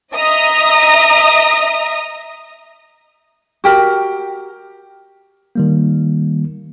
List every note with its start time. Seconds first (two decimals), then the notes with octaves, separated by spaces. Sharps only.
0.15 D#5 E5 A#5 D#6
3.64 F#4 G4 A#4
5.55 D#3 G3 A#3